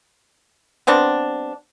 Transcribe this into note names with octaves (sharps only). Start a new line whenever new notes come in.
G3 B3 C4 D4